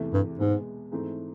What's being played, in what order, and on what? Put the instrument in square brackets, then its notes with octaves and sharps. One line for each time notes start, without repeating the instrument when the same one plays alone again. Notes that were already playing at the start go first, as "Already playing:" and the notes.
Already playing: [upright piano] E2 C3 E3 A3
[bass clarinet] G2
[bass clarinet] G#2 [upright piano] B2 G#3 B3
[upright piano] G#2 E3 A3 C4